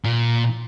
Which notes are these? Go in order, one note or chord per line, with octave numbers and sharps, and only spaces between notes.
A#2